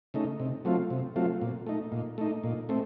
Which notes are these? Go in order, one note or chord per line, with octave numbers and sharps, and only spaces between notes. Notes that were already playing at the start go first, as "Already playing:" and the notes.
C#3 A3 D#4
C3
F#3 A3 C4 F4
C3
F#3 A3 C4 F4
A#2
A3 D#4
A#2
A3 D#4
A#2
A3 C4